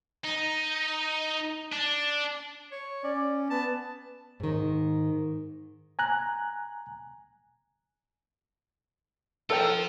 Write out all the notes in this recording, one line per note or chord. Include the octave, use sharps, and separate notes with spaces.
D#4
D4
C#5
C#4 D5
B3 A5
G#2 D#3
G#5 A#5 F#6
F3 F4 A4 A#4 G5